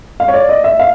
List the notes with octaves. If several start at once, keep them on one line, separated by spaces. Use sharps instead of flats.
F5
C#5
D5
D#5
E5
F5